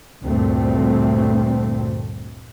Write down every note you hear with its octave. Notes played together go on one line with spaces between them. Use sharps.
D2 G2 A#2 A3 C4